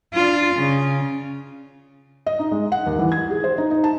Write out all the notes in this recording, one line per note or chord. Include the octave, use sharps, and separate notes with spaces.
D4 F4
C#3
D#5
D#4
G#3
F#5
D#2
E3
G#6
G#4
C5
D#4
D#4
A5